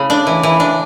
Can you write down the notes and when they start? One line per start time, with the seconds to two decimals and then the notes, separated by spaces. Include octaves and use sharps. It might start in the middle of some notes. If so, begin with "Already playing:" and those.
Already playing: C#3 A3 E4
0.10 D4
0.27 E3
0.43 E3
0.60 D4